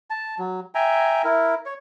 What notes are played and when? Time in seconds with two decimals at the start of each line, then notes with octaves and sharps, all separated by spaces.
0.10 A5
0.39 F#3
0.75 E5 G5 G#5 A#5
1.24 E4 A#4
1.66 C#5